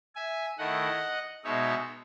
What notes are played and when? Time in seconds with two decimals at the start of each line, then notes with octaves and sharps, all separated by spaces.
0.15 E5 G#5
0.58 D#3 A3 E4 D#5 F#5
1.44 B2 G#3 D#4 C#5 E5